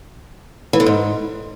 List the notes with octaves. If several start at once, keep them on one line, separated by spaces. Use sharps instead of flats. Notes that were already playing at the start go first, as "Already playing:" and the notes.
E3
D3
G#2